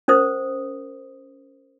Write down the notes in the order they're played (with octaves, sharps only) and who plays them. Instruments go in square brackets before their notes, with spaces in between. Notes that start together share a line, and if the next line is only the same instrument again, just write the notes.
[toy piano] C#4 A#4 C5 D#6